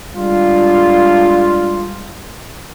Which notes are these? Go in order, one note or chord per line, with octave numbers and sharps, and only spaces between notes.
G3 G#3 D4 F4